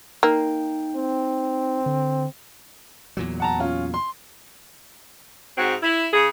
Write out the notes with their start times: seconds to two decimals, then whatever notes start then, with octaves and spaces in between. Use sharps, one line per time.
0.23 A#3 D#4 G5
0.96 C4
1.86 D3
3.17 E2 A#2 F#3
3.40 F#5 A5 A#5
3.59 C#4 F4
3.94 C6
5.57 G#2 C4 F#4
5.83 E4
6.13 C#3 G#4